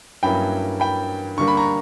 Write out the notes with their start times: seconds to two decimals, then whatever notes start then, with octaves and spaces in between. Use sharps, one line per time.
0.23 G2 F#3 A#3 C#4 E4 G5 B5
0.80 G5 B5
1.37 D3 G3 A#3 D4 C#6
1.48 B5
1.57 A#5 C#6